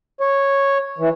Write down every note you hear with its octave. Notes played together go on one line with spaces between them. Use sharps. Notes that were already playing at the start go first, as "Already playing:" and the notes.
C#5
E3